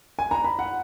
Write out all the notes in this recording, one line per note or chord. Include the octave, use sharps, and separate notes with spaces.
G#5
A#5
B5
F#5